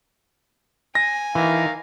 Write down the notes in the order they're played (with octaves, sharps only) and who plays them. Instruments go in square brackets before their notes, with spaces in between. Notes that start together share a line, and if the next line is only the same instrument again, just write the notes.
[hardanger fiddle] G#5 [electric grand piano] A#6
[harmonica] D#3 F5 A#5 [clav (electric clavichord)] E3